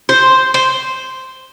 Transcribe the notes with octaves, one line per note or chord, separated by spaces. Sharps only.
C5
C5